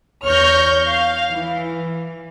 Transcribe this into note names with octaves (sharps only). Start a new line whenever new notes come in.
E2 C#5 C#6 F6 G6 A#6
F5
E3